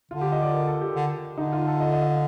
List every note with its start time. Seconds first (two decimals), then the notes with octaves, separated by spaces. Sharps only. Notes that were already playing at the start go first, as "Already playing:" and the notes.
0.11 D3 F4
0.22 G4
0.32 D#5
0.43 D5
0.54 A#4
0.67 A4
0.81 G4
0.96 D3
1.38 D3 D#4
1.53 F4
1.67 A4
1.81 D#5
1.92 D#5
2.01 F5